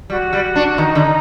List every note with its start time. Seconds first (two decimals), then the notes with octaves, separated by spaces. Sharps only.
0.10 G3 F#4
0.33 G3
0.56 D4
0.78 D#3 D#4
0.95 D3